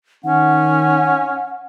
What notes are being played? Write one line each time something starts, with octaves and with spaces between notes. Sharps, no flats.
D#3 C#4 F#5